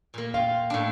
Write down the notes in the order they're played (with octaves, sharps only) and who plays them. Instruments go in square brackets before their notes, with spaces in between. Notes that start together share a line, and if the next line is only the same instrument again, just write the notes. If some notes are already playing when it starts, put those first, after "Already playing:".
[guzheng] A#2 A#3
[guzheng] F4 [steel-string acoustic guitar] F5 G5
[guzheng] A2 D4